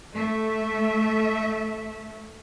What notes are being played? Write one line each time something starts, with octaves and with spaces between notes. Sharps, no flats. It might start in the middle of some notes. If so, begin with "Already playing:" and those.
A3 E5